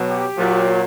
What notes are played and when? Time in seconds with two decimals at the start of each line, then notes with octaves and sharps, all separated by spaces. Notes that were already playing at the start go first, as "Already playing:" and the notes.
Already playing: B2 F#3
0.08 G4
0.37 A#2 F#3